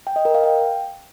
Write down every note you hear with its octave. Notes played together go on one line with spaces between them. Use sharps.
G5
D#5
A#4
F5
G5